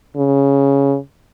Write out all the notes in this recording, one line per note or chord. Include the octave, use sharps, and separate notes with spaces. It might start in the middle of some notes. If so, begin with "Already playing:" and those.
C#3